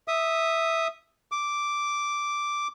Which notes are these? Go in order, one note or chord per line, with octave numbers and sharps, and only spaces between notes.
E5 D#6
D6